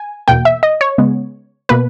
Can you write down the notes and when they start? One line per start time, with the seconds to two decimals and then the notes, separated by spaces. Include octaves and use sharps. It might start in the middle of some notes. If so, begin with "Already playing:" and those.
Already playing: G#5
0.28 E2 B2 A#3 G5
0.45 E5
0.63 D#5
0.81 C#5
0.98 C#3 G#3 B3
1.69 B2 A#3 B4